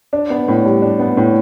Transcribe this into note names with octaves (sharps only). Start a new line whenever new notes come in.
D4
B3
A2
G3
D4
B3
A2